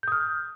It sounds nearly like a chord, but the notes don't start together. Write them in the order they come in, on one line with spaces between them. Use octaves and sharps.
G6 D#6 F6